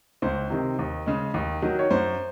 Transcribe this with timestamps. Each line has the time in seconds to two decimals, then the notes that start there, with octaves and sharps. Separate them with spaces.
0.22 C#2 C5
0.50 C3 D#3
0.79 D#2
1.06 C#3 G#3
1.34 D#2
1.62 D#3 F#3
1.79 C#5
1.91 F#2 C5